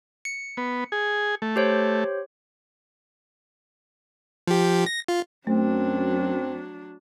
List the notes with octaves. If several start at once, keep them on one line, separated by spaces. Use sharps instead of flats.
C#7
B3
G#4
A3
G4 C5 C#5
F3 G4
A#6
F4
F#2 F#3 A3 C4 D4